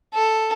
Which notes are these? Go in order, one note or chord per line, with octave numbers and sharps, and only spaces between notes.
A4